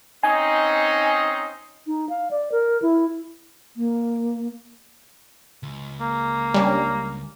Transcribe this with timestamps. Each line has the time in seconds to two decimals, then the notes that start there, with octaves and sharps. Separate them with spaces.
0.23 C4 C#4 D#4 G#5
1.87 D#4
2.09 F5
2.31 D5
2.52 A#4
2.82 E4
3.76 A#3
5.63 C#2
6.00 A#3
6.54 G3 C#4 D4